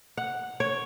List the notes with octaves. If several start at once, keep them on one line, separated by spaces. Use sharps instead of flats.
F#5
C#5